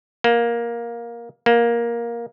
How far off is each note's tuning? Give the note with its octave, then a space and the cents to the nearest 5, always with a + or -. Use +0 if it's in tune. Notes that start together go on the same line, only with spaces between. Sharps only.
A#3 +10
A#3 +10